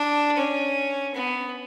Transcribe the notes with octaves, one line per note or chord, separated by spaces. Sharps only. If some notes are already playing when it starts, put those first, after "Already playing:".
Already playing: D4
C#4
B3